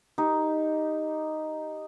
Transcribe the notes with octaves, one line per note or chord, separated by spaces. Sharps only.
D#4 G4 D#5